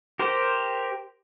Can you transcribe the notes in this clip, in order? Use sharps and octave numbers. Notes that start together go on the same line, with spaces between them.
G4 A#4 C5